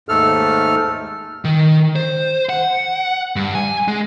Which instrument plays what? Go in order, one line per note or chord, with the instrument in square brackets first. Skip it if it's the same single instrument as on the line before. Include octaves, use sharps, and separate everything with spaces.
[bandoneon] D#2 G#2 A3 A4 F6
[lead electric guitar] D#3
C5
F#5
G2
G#5
G#3